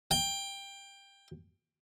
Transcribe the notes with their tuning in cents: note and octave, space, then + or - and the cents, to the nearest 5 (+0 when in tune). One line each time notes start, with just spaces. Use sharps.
G5 +15